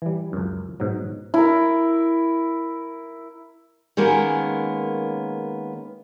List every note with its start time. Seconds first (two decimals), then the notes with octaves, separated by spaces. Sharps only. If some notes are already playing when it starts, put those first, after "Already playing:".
0.02 E3 G3
0.33 C#2 F#2
0.80 G#2 B2 F#3
1.34 E4 A#4
3.97 D#3 G#3 A#3 B3 C#4